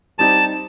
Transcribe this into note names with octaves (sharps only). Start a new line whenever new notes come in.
G3 C4 D#4 G4 A5